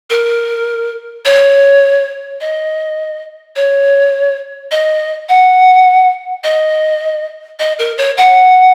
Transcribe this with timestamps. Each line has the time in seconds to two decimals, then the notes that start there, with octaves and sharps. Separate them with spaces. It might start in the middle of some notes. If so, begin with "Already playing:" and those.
0.10 A#4
1.25 C#5
2.41 D#5
3.56 C#5
4.71 D#5
5.29 F#5
6.44 D#5
7.59 D#5
7.79 A#4
7.97 C#5
8.17 F#5